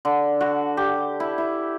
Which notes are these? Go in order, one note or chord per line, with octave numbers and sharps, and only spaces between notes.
D3
F#4
G4
E4
E4